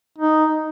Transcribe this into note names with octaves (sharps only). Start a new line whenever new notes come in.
D#4